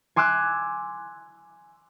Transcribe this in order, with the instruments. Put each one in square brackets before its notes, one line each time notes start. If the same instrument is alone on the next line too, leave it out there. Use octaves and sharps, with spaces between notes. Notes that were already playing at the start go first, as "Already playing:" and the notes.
[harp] G#5 C6 D6 E6 F#6